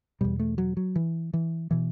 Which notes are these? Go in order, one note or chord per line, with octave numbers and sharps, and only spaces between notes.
E2 B2 G3
A3
F#3
F#3
E3
E3
B2 E3